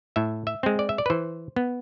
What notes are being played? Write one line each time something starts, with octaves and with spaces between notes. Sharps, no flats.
A2 E5
E5
G#3 C4
D5
E5
D5
B4
E3 C5
B3